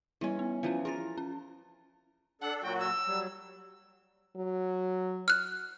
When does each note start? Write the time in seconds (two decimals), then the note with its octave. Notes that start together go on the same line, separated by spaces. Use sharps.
0.21 E3 G3 C#4 E4
0.39 B3
0.63 E3 F3 C#4 F5
0.85 F3 E4 A#4 A6
1.17 C#4
2.41 D4 A4 F#5
2.62 A#2 F#3 F#4 G5
2.79 E6
3.06 F#3 G3
4.36 F#3
5.28 F6 F#6